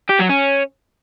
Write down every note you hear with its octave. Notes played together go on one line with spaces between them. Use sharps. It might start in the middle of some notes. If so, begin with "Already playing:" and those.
G4
F#3
C#4